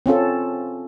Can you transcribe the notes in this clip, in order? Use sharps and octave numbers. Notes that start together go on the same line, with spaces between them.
C4 C#4 F4 A4